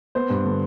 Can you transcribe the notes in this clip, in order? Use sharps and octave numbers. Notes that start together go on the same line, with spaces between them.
B3 C5
G2
D3